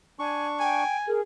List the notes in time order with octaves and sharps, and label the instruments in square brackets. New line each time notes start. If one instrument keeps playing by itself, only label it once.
[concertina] D4 C#6 [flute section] G#5
[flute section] G5 [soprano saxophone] G#5
[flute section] G#4 A#4